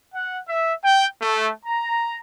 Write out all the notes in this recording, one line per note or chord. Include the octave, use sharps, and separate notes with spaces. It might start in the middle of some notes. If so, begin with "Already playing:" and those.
F#5
E5
G5
A3
A#5